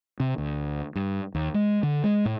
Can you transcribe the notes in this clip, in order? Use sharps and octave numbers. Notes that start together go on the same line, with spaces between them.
C3
D2
G2
D#2
G#3
D3
G#3
A2